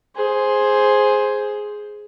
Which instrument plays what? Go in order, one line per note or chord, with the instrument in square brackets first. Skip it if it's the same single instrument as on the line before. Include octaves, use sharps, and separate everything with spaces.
[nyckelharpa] G#4 C5